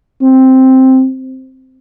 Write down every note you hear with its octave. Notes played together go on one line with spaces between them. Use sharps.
C4